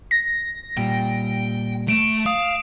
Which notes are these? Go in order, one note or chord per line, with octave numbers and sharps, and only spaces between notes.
A#6
A#2 G3 G5
A3 D7 E7
F5 D#6